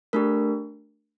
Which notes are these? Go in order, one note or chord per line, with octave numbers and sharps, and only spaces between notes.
A3 D4 G4 A#4